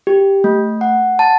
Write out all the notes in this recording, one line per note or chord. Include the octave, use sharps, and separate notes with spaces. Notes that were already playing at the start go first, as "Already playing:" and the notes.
G4
A3
F#5
A5